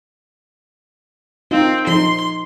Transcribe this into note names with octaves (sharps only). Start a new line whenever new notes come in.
C4 D#4 F4
F3 D#4 C6